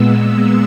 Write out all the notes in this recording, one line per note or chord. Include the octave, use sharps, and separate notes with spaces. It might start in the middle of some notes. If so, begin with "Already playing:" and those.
Already playing: A#2 G#3 B3 E6